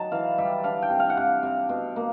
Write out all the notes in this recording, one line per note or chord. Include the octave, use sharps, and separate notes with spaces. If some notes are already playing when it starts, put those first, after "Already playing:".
Already playing: F#3 D#4 A5
E3 F5
G3 E5
D4 F5
G5
C3
F5
F#5
C3 F5
C3
B2
A#3